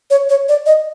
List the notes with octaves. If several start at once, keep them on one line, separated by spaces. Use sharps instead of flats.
C#5
C#5
D5
D#5